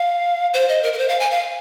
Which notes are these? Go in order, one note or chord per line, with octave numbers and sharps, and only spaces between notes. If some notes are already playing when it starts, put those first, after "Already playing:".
Already playing: F5
C5
D#5
A#4
A#4
C5
F5
G#5
F5